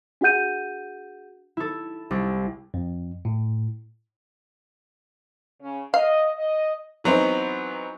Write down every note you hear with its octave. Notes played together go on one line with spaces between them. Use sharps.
D4 F#4 G#4 F#5 G6 D#7
E4 A4
C2 G3
F2
A2
C#3 C#4
D#5 F5
D#5
E3 F#3 B3 C4 D#4